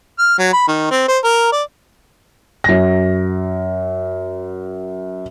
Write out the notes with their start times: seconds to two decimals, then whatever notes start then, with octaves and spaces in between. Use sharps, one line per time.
0.19 F6
0.38 F#3
0.53 B5
0.68 D#3
0.91 C4
1.08 C5
1.24 A#4
1.52 D5
2.64 F#2 A#6